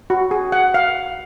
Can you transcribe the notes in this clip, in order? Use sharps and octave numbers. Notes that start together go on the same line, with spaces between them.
F#4
G#4
F#5
F5